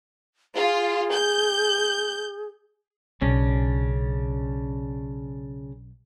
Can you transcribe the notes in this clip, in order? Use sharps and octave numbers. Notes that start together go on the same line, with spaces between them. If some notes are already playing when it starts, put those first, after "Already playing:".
F4 G#4
G6
B1 C#3 C#4 D4